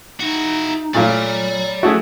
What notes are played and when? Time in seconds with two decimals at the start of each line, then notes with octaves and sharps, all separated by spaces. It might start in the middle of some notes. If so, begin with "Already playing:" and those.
0.20 D#4 E4 F#4
0.94 A#2 F#3 A3 F4 D5 B5
1.83 A3 E4 F#4 G#4